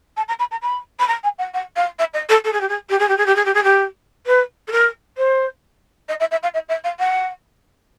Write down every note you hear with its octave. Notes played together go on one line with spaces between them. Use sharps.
A5
A#5
B5
A#5
B5
B5
A#5
G#5
F#5
F#5
F5
E5
D#5
A4
A4
G#4
G4
G#4
G4
G#4
G4
G#4
G4
G#4
G4
G#4
G4
B4
A4
A#4
C5
D#5
E5
E5
F5
E5
E5
F5
F#5